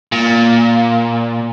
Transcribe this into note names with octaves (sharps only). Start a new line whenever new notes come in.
A#2